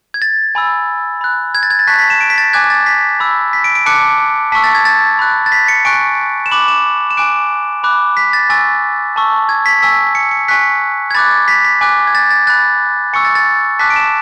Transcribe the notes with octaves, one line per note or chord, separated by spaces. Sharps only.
G#6
A6
G#5 B5 E6
B5 F#6
G#6
A6
G#6
A6
A5 C#6 F#6 B6
B6
E7
D7
B6
A6
G#5 D6 F#6 G#6
A6
B6
B5 E6
B6
D7
D7
A5 D6 F#6 C#7
A5 C#6 E6 B6
A6
G#6
A6
B5 F#6
A6
B6
C#7
G#5 C#6 F#6 D7
E7
B5 D6 F#6 F#7
E7
E7
G#5 D6 F#6 D7
B5 D6 F#6
B6
A6
G#5 C#6 E6 A6
A5 C#6 E6
G#6
B6
G#5 C#6 E6 B6
C#7
C#7
G#5 C#6 F#6 B6
G#6
B5 D6 F#6 A6
B6
B6
G#5 D6 F#6
G#6
A6
A6
B5 F#6 A6
G#5 C#6 E6 C#7
A6
A6
A5 D6 F#6 B6
D7
E7